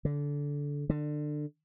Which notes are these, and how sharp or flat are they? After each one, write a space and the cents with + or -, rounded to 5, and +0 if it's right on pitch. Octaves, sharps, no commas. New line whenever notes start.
D3 -20
D3 +25